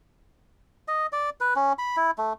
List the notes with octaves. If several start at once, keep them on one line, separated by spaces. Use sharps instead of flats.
D#5
D5
B4
C#4
B5
E4
A3